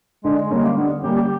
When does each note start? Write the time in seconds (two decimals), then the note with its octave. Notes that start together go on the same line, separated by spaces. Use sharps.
0.24 D3 G#3
0.37 G#3
0.51 G3 G#3 A#3 C#4
0.63 A#3
0.77 D3 B3
1.02 G3 A#3 C#4 G4
1.15 G4